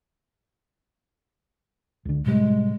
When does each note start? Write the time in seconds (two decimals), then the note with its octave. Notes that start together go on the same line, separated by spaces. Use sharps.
2.05 C#2 D3
2.26 A2 C3 G3 G#3